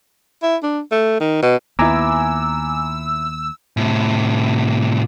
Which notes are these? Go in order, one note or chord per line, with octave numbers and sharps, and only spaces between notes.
E4
D4
A3
D#3
B2
D#2 B3 E4 G#5 A#5 D6 E6
A2 C3